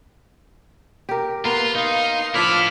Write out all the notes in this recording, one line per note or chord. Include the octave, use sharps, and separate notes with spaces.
G4 A#4
A#3 B3 F4 A#4 B4 C6
D#4 F5
F3 D4 E4 A4 F5 B5 D6 F6